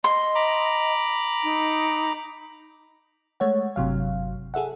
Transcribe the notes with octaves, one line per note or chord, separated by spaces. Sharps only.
D#5 C6
A#5 B5 D6
D#4
G#3 A3 C#5 F#5
G1 C3 F#3 F5
G#4 A4 E5 F#5